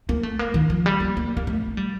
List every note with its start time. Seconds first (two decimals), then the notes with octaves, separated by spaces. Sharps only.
0.09 A#3
0.23 A3
0.39 A#3
0.54 D#3
0.70 F3
0.86 G3
1.00 A#3
1.17 A#3
1.37 A#3
1.47 A3
1.77 G3